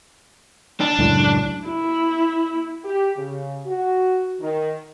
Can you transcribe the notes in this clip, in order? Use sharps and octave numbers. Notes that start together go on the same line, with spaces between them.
D4
C#2 F#2 A2
E4
G4
C#3
F#4
D#3